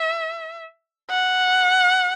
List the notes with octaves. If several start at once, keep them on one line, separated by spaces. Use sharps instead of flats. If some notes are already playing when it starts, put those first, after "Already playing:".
Already playing: E5
F#5